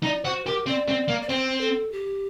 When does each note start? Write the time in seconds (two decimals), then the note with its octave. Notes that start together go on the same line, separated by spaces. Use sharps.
0.03 D#4 D5
0.24 F#4 C5
0.46 G4 A#4
0.66 C4 D5
0.88 C4
1.08 A#3
1.22 D5
1.29 C4 C5
1.61 A4
1.92 G4